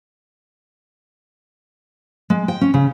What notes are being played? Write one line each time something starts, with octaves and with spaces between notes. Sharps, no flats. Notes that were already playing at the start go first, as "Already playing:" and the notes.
G#3
G5
C#4
C#3